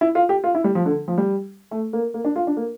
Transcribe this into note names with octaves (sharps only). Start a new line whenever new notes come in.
E4
F4
G4
F4
E4
G3
F3
D3
F3
G3
A3
A#3
A#3
D4
F4
D4
A#3